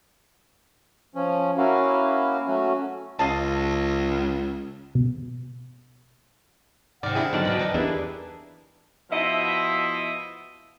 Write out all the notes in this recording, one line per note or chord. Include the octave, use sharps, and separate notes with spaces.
F3 C#4
A#3 C#4 E4 F#4 F5
F#3 A3 C#4 F#4
C#2 D#5 F5 A5
B2
C3 D#3 D5 F#5 F6
D4 E4 G#4
D3 F#3 D#4 D5 A5
E2 B2 D5 D#5 G5 B5
E3 D#4
E2 D4 E4 G4 G#4 A#4 B4
B2 F3 E4 D#5 E5